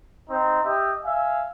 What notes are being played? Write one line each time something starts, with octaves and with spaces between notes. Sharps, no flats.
C4 D#4
G4 D#5 E5
E5 F5 G#5